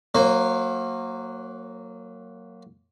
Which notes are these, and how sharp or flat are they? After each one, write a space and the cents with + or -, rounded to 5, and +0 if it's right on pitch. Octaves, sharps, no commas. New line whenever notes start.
F#3 +0 A#3 -15 C5 +40